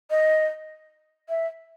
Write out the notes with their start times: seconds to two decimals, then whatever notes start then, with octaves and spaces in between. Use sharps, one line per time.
0.10 D#5
1.29 E5